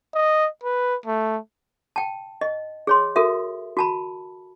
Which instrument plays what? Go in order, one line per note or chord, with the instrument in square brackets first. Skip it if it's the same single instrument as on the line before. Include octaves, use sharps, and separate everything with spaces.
[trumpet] D#5
B4
A3
[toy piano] G5 A5
D#5
G#4 C#5 C6
F#4 A4 A#4 E5
F#4 A5 B5